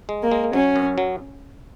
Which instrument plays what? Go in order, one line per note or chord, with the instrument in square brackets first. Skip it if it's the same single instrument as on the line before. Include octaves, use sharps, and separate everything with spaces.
[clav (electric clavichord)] G#3
[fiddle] A#3
[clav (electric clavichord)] G#3
[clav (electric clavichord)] F#3 [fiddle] C#4
[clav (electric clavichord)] F#2
F#3